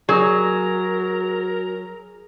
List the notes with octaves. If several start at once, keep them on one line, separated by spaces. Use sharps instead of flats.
F#3 F#4 G#4 A#4